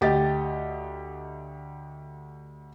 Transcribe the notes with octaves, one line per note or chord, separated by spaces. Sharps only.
D2 G4 D#5 A6